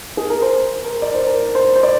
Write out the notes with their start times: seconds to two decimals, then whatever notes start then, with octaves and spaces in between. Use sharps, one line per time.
0.17 G#4
0.30 A#4
0.42 C5
0.84 A#4
1.02 D5
1.15 C5
1.27 A#4
1.55 C5
1.76 C5
1.83 D5